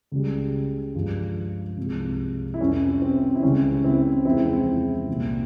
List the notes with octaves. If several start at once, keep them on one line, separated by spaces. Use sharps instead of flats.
C#2 C#3 G3
G2 F3 G#3
C2 C3 F3 G#3
E4
F2 C3 G3 C#4
C4
E4
C#2 C#3 G3 C#4
C4 E4
E2 C3 F3 G#3 C4 E4
C2 A#2 G3